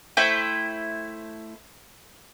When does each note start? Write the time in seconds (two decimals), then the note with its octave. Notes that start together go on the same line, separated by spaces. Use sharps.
0.17 A3 E4 C5 G5